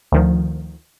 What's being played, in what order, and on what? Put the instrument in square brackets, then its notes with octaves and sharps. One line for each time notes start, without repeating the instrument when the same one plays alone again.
[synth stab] D2 D#3 F3